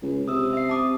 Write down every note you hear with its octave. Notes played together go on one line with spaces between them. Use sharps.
C#2
C3 D#6 E6
E5 C7
A5 D6 D#6